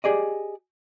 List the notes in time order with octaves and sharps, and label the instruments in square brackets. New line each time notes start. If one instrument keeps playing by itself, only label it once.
[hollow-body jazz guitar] G4 G#4 D5 D#5